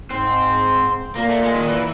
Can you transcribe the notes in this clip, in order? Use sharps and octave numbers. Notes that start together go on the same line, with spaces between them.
G#2 C4
A#2 A#3
A3
G#3
D#3
E3